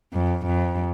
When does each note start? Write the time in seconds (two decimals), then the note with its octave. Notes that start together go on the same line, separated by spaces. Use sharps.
0.14 F2
0.46 F2